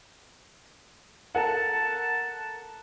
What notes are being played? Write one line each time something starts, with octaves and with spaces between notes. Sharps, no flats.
A4 A#4 F#5 A5